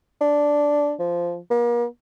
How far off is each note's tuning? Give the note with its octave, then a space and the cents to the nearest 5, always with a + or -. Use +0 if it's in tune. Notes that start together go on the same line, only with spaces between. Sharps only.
D4 -5
F3 -10
A#3 +40